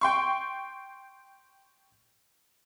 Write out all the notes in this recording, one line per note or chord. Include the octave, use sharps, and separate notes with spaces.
G5 C6 C#6